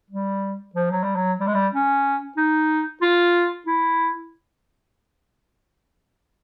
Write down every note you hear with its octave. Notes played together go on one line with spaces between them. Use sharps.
G3
F3
F#3
G3
F#3
G3
G#3
G3
C#4
D#4
F4
E4